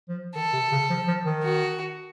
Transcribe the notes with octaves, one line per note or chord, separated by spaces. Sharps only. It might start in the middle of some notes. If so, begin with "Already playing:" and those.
F3
D#3 A4
C3
C#3
F3
F3
D#3
F#4